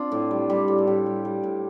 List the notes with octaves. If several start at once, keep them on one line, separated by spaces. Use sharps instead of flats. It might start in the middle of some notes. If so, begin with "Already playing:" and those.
Already playing: C4 D4 F4
A2
G3
G3
A2
A4
A2 G4
G3
G3
A2